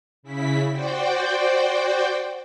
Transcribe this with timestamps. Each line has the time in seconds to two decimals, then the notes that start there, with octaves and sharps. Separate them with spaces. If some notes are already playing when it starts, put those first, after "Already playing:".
0.23 C#3 E4 B6
0.71 F#4 C5 D5 G5